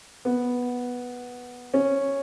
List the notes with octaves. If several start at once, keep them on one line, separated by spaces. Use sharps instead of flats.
B3
C#4